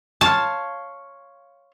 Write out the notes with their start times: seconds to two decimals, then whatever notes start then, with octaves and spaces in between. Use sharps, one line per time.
0.21 C#5 F5 A5 C6